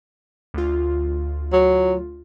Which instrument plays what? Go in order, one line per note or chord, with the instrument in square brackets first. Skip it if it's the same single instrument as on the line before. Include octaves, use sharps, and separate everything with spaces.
[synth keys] D2 F4
[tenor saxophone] F#3